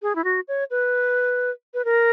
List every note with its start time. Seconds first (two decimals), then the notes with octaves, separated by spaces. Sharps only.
0.02 G#4
0.15 E4
0.24 F#4
0.48 C#5
0.70 B4
1.74 B4
1.85 A#4